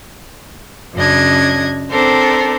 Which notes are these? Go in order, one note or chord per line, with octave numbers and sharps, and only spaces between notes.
F#2 C#3 D4 D#5 G#6
C4 D4 A4 A#4 C5